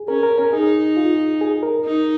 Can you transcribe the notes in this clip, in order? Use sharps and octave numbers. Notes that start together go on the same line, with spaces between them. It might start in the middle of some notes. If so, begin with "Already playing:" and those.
Already playing: G#4
C#4 A#4
A#4
A#4
D#4 G#4
F4
G#4
A#4
D#4